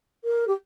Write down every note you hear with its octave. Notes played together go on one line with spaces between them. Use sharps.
A#4
G4